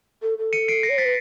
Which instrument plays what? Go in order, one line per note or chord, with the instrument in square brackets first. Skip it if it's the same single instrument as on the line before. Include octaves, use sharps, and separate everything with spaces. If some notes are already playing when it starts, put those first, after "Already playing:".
[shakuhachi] A4
A4
[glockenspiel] C#7 D#7
C7 D7
A#6 C7
[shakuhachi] C#5
[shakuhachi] C5 [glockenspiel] A6 B6
[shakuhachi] B4